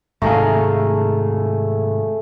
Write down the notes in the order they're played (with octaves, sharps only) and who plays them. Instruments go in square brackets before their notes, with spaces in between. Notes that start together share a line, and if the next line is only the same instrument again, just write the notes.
[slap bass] G#2 C3 D#3 [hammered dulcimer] A3 G#4 [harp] F5 A#5